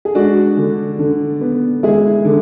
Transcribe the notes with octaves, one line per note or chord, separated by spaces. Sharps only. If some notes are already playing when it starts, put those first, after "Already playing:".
G#4
G#3 D4 F#4
D3
D3
B3
G#3 E4 G#4
D3